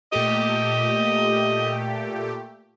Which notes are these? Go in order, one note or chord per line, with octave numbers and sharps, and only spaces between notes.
A#2 A3 G4 D#5